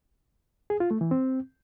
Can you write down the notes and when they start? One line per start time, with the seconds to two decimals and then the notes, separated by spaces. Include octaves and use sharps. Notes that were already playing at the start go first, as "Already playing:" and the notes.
0.70 G#4
0.80 F4
0.91 A3
1.01 E3
1.11 C4